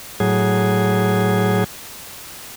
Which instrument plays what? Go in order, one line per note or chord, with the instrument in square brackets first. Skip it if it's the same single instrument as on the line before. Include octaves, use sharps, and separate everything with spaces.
[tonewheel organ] A2 F#3 G#4